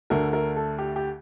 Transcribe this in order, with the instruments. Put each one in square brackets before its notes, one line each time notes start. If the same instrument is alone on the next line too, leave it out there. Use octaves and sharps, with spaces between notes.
[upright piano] D2 D3 A3 A#4
A#4
A4
G4
G4